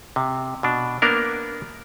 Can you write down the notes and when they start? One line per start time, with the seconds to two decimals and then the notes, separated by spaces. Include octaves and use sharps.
0.16 C3
0.63 B2 D4
1.02 A#3 B3 D4 A#4